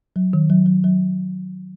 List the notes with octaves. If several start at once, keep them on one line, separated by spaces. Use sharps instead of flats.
F#3
D#3
F#3
F#3
F#3